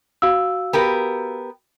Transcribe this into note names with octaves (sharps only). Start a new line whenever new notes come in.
F#4 F5 E6
B3 G4 A#4